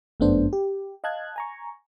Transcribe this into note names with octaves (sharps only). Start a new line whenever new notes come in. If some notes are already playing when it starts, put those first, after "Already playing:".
G1 F#2 A3 B3 D4 C5
G4
D#5 F5 A5 F#6 G#6
G#5 A#5 C#6